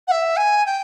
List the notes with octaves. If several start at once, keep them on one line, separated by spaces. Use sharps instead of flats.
F#5
E5
G#5
G5